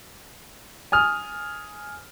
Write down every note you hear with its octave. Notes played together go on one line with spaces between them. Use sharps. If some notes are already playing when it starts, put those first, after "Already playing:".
G#5 D#6 F6